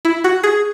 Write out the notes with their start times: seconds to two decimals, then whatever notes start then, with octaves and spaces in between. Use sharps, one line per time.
0.05 E4
0.24 F#4
0.43 G#4